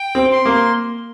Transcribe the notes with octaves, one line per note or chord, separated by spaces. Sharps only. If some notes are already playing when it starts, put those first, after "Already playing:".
Already playing: G5
C4
C6
A#3